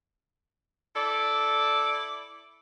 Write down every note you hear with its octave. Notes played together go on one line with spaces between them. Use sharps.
E4 A4 D5